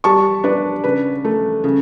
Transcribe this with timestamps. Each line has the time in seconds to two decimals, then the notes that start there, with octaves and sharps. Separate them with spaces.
0.04 G3 A5 C#6
0.44 D4 B4 D5
0.84 C#3 B4
1.25 A3
1.64 C#3